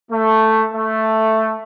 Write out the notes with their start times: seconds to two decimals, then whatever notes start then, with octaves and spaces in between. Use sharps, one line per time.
0.11 A3
0.71 A3